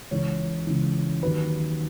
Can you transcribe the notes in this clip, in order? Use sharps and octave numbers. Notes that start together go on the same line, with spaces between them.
C#2 C#3 E3 C#5
C#2 C#3 E3
D#2 D#3 F#3 B4